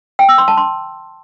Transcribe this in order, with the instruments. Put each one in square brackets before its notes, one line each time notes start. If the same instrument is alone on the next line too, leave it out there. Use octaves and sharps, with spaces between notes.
[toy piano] G5
E6
C6
A5
C6